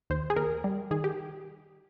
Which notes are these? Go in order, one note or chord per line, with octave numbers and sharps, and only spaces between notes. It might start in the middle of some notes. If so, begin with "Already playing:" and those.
D#2 C5
G#4
D#2 A#4
G3
D#3 G#4
G4